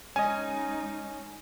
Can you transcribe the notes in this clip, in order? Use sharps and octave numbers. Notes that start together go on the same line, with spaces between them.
G#3 C#4 D#4 D#5 G#5